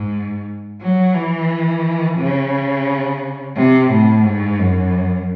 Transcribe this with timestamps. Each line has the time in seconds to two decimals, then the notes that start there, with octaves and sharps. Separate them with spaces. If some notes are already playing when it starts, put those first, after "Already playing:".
Already playing: G#2
0.81 F#3
1.15 E3
2.18 C#3
3.57 C3
3.91 A2
4.26 G#2
4.59 F#2